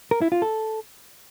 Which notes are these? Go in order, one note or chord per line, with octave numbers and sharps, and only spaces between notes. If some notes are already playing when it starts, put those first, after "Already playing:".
A#4
E4
F4
A4